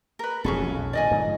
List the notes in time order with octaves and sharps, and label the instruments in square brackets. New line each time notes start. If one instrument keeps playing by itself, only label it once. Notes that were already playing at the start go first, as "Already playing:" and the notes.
[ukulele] A#4 B4
[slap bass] E1 F2 F#3 [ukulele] C#4 G#4 A4
[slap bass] B1
[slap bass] A#2 D#3 [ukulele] D5 D#5 G#5
[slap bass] G#2 D3 F3